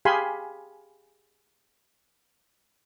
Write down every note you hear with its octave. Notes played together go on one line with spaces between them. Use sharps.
G4 G#4 F5 G#5 B5 C6